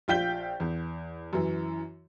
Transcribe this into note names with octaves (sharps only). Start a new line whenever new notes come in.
A#1 F4 G5 G6 B6 G7
E2
F#2 E3